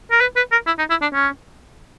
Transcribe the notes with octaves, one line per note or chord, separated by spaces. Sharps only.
A#4
B4
B4
A#4
E4
D#4
E4
D4
C#4